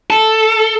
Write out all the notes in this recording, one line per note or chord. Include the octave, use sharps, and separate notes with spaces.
A4